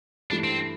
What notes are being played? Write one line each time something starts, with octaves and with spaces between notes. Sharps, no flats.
G2 E3 A3 D4
C4